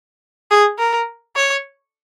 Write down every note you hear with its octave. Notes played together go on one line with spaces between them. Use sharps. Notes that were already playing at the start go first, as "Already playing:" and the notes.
G#4
A#4
C#5